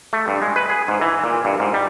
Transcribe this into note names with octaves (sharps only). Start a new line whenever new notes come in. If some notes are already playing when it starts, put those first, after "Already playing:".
A3
G2
G#3
B4
G#4
G#2
E3
A#2
G2
G#2
G3